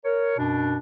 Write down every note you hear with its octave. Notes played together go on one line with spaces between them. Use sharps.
A#4 C#5
F#2 B2 D4